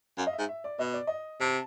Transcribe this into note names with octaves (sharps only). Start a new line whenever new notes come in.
F#2 F5
D#5
E5
G#2
E5
D5
B2 D#5
D5
D#5
C3 A5